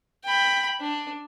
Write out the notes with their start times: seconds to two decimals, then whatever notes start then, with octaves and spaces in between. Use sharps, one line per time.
0.24 G5 B5
0.81 D4